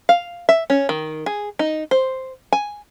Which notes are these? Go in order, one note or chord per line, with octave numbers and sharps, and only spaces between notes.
F5
E5
C#4
D#3
G#4
D#4
C5
G#5